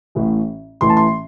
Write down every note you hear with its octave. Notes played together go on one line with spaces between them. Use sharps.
A1 A2 E3
A1 A2 E3 C6
A5
C6